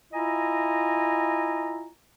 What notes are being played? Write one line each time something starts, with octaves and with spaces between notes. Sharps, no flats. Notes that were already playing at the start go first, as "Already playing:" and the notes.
E4 F4 D#5 G#5 A#5